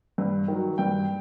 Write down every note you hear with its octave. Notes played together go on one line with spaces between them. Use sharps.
G2
D#3 F#3
G2 G5